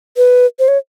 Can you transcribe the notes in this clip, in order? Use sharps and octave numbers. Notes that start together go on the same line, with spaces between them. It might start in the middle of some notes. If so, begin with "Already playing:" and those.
B4
C5
C#5